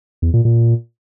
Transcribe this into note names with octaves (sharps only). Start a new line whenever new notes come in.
E2
A#2
A#2